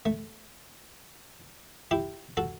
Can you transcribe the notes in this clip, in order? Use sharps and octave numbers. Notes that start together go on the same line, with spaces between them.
A3
E4 G4
F#4 A4